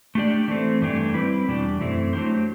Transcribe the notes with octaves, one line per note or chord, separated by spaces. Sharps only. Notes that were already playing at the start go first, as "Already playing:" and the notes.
A3 D4 G4 D5
E3 A3 C4
G2 E3 A3 D4 G4
G3 C4 E4 B4 D5
E2 B2 G3 D4 G4
F#2 E3 A3 C4 E4
F#3 A3 D4 G4 C5